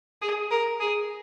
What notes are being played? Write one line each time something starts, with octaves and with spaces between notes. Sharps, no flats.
G#4
A#4
G#4